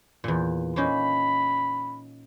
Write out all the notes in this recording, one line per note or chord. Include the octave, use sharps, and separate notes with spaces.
E2 A#2
A#3 C#4 D#4 B5